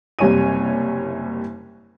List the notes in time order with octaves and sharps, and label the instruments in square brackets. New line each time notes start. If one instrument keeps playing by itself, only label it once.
[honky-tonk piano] F#1 C3 G3 C#5 G#5 D#7